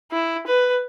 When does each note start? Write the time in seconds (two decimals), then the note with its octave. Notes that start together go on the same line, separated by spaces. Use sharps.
0.12 E4
0.47 B4